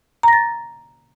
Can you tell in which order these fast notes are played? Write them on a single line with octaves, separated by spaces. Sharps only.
A#5 A#6 A6